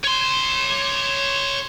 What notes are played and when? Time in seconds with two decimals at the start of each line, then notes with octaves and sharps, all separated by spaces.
0.04 C#5 C6